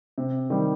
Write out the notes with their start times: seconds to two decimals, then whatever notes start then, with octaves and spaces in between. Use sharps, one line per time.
0.18 C3
0.50 D#3 G3